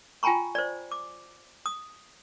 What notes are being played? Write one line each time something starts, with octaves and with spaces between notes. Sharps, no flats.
F4 G5 G#5 A#5 B5 C#6
C5 D5
D6
D#6